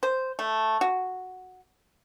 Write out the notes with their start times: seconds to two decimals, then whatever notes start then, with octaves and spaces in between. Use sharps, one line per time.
0.03 C5
0.39 A3
0.81 F#4